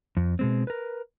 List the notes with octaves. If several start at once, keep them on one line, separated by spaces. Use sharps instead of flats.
F2
B2 G#3 C4
A#4 B4